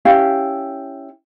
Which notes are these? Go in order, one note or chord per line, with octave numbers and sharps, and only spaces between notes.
C#4 E4 G4 F5